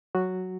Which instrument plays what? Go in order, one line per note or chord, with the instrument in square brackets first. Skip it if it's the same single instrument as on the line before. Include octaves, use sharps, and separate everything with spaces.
[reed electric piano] F#3 F#4